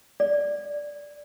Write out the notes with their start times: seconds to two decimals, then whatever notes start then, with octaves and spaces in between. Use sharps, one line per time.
0.20 D5